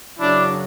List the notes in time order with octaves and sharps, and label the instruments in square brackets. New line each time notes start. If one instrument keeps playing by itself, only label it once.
[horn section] F#2 C#3 F#3 D4 E4